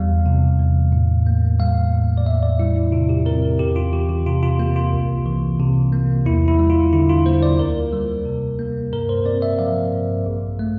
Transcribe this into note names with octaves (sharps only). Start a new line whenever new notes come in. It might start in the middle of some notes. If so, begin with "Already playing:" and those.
Already playing: E2 G3 F5
C3
E2
A2
A#3
G3 F5
A2
D5
E2 E5
D5
G3 E4
E4
C3 F4
G4
C4 A#4
A#4
E2 G4
F4
E3 G4
G4
C3 F4
F4
A#3 G4
F4
C2
E3
C3
A#3
E2 E4
E4
G3
F4
D3 E4
F4
A#3 C5
D5
D2 A#4
G3
C3
A#3
G2 A#4
C5
C4 D5
E5
F3 F5
G2
A#1
A3